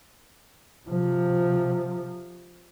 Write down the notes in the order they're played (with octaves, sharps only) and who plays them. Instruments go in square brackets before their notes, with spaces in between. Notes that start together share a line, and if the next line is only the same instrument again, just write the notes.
[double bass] C3 F3